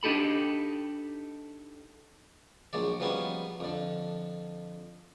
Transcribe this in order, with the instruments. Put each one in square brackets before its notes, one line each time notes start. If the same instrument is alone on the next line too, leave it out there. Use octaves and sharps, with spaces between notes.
[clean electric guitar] D4 D#4 G4 A4 B5
[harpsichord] A#1 F#3 G#3 D5
F3 G3 B3 C#4 D#4 F#4
F2 D3